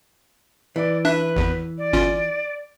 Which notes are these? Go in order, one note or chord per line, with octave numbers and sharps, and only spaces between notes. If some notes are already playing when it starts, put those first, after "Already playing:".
E3 D5
D4 B4 E5 F#6
G#1 E2
D5
G1 C#4 F4